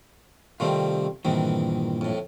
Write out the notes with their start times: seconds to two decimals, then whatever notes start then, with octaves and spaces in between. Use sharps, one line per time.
0.60 C3 D#3 G3 A3 C4 F4
1.25 E2 G2 A#2 D#3 E3 C4
2.01 F2 A2